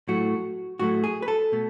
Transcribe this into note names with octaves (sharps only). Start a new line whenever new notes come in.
A2 F#3 A3 E4 F#4
A2 F#3 A3 E4 F#4
G#4
B4
A4
B2 A3